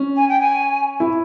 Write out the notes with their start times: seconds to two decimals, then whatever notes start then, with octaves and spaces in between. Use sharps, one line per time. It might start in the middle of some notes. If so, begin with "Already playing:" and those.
Already playing: C#4
0.17 G#5
0.29 G5
0.41 G#5
1.00 E4